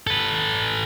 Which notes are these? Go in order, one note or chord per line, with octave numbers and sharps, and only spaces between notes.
A4 B4